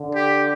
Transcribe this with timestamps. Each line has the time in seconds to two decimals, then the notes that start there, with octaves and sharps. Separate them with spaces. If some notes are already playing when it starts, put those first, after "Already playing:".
Already playing: D3
0.15 G4